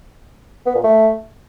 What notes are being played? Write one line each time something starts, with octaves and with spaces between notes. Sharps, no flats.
B3
A#2
A3